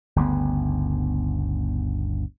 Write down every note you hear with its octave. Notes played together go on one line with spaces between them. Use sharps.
G1 D2 C#3 B3